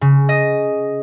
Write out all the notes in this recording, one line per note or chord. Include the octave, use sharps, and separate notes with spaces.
C#3
D#5